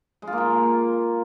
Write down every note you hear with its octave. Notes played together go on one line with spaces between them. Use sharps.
G#3
F4
A#3
F4